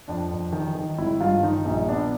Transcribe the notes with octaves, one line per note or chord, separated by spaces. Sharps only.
F2 D4
F2
D#3
D#3
G#1 E4
G2 F4
D#3 D#4
A#1
B3 D4